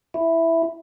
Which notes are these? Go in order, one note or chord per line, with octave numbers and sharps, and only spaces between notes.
E4